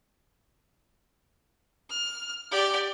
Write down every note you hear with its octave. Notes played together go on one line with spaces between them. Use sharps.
F6
G4 D5